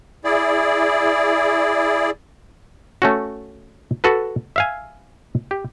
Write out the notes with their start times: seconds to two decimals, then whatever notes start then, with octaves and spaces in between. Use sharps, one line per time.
0.24 E4 G#4 D5
3.02 A3 C#4 F#4
4.04 F#4 A4 B4
4.56 E5 F5 G#5
5.51 G4